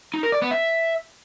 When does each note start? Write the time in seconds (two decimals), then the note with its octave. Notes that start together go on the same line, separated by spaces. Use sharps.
0.14 D#4
0.23 A#4
0.32 D5
0.42 B3
0.51 E5